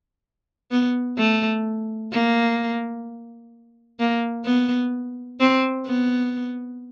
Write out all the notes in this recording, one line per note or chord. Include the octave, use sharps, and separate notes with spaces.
B3
A3
A#3
A#3
B3
C4
B3